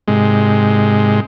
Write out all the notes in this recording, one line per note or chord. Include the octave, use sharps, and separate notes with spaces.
G#2 C3 G#3